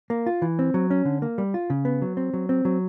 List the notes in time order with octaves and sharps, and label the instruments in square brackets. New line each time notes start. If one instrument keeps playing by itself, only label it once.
[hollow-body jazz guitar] A#3
F4
E3
C4
F#3
C#4
D3
A#3
G3
F4
C#3
B3
F#3
C4
F#3
C4
F#3